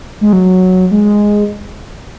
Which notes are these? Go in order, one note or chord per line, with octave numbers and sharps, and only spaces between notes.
G#3
F#3
G#3